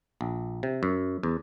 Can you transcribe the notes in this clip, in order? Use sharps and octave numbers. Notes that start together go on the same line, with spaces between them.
A#1
C3
F#2
E2